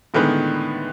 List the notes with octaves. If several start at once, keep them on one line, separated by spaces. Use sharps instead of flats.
A2 D3 D#3 G#3 B3